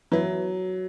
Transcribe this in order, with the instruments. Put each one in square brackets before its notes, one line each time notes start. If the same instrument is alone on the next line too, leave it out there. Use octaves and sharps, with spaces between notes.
[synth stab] F#2 E3 B3 E4 [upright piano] F#3